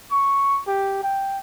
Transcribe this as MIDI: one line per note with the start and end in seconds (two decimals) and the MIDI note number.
0.11 0.61 85
0.67 0.99 67
1.03 1.39 79